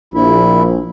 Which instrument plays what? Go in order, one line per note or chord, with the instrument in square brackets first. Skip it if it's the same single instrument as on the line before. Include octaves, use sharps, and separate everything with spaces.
[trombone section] A#1 [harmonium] E4